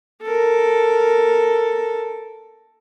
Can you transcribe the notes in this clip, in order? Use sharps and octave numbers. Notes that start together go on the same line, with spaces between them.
A4 A#4